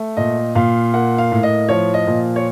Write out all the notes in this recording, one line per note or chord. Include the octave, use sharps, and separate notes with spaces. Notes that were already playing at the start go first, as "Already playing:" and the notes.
Already playing: A3
A#2 D#5
A#2 F5
A#3 F#5
F5
A2
D#5
F3 C#5
D#5
A#2
C#5